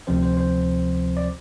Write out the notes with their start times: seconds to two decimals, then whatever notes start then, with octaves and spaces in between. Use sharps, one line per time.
0.07 D2 C3 F3 C4 C5
0.23 C5
0.37 C5
1.17 D5